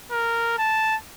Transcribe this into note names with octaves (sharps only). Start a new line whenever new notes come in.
A#4
A5